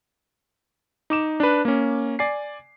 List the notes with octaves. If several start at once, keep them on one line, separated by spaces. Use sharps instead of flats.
D#4 D6 E7
D4 B4
A#3 C#4
D5 G#5 C7